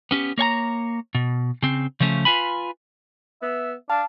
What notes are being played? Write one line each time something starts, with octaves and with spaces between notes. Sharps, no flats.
B3 C#4 G4
A#3 C#5 G#5 A#5
B2
C#3 C4
C#3 F3 A3 C#4
F4 B4 G#5 B5
B3 E5
D4 F5 A5